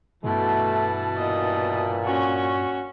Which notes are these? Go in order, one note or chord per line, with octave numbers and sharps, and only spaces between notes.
G2 B2 E3 A3 A5
A#2 D#5
C#4 F#4